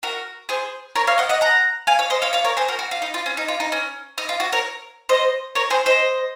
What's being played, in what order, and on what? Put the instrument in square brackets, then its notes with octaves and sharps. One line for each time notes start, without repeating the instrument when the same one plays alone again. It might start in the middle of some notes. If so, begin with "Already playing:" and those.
[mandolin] F#4 A#4
G#4 C5
A#4 C#5
C#5 F5
D#5 F#5
D#5 F#5
F#5 A#5
F5 G#5
C#5 F5
C5 D#5
C#5 F5
C#5 F5
A#4 C#5
G#4 C5
F#4 A#4
F#4
F4
D#4
F4
C#4
D#4
F4
D#4
C#4
D#4
F4
F#4
A#4 C#5
C5 D#5
A#4 C#5
G#4 C5
C5 D#5